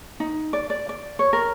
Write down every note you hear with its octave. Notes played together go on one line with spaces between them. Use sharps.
D#4
D5
D5
D5
C#5
A#4